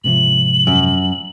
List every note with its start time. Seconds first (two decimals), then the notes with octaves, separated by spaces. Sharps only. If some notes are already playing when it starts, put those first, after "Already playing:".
0.04 G#2 C3 F3 F#7
0.67 F#2